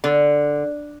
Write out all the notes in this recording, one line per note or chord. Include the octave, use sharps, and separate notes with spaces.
D3